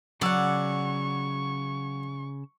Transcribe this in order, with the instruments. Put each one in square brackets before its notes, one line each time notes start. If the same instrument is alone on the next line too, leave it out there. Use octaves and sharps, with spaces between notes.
[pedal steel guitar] C#3 E6 [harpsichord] F#3 [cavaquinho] D5 F#5 [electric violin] C#6